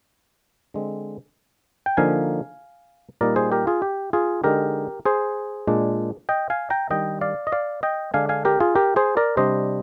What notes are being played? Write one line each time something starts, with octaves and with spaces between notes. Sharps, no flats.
D3 G#3 C4
G5
D3 F3 A#3 D#4 F5 G#5
A#2 G3 A#3 D#4 A#4 D5
G#4 C5
G4 A#4
F4 G#4
G4
F4 G#4
D3 G#3 D#4 G4 A#4
G#4 C5
A#2 G#3 D4
D#5 G5
F5 G#5
G5 A#5
D#3 G3 D4 D#5 G5
D5 F5
D#5
D5 F5
D#5 G5
D3 G#3 D4 F5 G#5
F5 G#5
G4 A#4
F4 G#4
G4 A#4
G#4 C5
A#4 D5
C3 G3 D4 C5 D#5